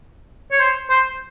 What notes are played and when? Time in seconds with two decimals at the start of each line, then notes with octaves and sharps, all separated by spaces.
0.52 C#5
0.59 C5
0.90 C5